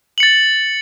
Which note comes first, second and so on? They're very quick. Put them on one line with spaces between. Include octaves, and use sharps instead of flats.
F#7 C#7 A6